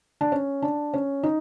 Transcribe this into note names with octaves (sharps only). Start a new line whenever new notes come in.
D4
C#4
D4
C#4
D#4